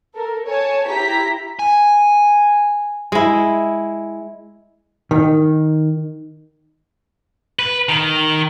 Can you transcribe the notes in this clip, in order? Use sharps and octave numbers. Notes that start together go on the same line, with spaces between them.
A4 A#4
C#5 G#5 A5
E4 G4 A#5 B6
G#5
G#3 E4
D#3
B4
D#3